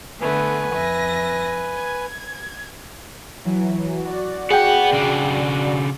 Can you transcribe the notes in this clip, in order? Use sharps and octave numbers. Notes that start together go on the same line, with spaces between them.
D3 A3 B3 B4 G#5
F2 E5 A#6
G#6
E3 F#3
F#4 D5
B3 G#4 F#5 G5
C#3 D4